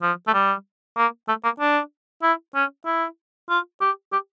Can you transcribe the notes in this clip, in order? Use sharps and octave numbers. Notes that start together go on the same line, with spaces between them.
F3
A3
G3
A#3
A3
A#3
D4
E4
C#4
E4
F4
G4
G4